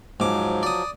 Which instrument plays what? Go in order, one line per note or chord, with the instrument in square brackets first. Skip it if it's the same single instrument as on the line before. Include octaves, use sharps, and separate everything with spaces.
[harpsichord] G#2 D6 [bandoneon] F3 F#3
[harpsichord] D5 D#6